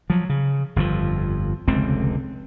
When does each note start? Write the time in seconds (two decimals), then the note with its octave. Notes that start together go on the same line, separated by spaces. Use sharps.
0.10 F3 F#3
0.30 C#3
0.76 G1 F2 D3 F3
1.68 F1 C#2 D3 C4